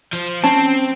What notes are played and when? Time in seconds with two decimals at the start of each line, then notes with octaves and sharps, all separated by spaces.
0.13 F3
0.44 C4 C#4 A5